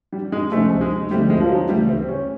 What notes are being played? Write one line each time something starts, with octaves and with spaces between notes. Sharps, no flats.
G3
G#3
D2 C3 F3 G#3 A3 C#4
G#3
D2 D3 F3 G3 A3 C4
G#3
F3
F#3
D2 C#3 E3 G3 A3
C4
C#4